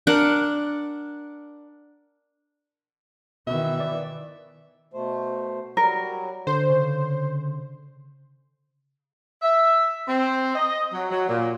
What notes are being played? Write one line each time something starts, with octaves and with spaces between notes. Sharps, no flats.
D4 A#4 F#5
B2 D#3 E3 E5
D5
B2 A3 C5
F#3 G3 A#4
D3 C5
C#3
E5
C4
D#5
F#3
F#3
A#2